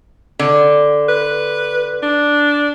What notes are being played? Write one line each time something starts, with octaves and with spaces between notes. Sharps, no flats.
D3
B4
D4